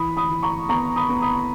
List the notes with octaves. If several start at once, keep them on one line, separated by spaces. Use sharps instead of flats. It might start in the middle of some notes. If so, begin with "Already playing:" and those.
Already playing: E3 B5 D#6
B5 D#6
E3
A#5 C#6
B3 A#5 C#6
B5 D#6
B3
B5 D#6